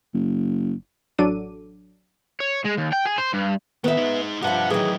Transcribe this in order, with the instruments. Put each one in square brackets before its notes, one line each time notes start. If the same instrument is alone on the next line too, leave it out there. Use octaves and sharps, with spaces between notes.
[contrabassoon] F#1
[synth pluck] A1 F#3 D4 A4 D6 D#7
[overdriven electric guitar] C#5
G#3
D#2
G5
G#4
C5
G2
[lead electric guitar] D#3 [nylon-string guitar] B3 E5
[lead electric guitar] D#4 G#4
[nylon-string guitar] G2 F3 G3 [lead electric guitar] G4 E5 [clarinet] F#5
[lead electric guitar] A2 F#3 [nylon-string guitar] D#3 E3 [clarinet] G#4